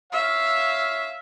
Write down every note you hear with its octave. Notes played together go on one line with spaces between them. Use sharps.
C#5 E5 F5